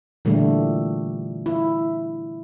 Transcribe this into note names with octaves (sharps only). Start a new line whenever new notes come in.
A#2 D3 E3 G3 A3
E4